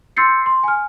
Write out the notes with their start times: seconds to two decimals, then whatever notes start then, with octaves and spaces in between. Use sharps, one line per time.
0.17 C6 E6 G6 A6 C7 C#7
0.46 C6
0.64 G#5 F6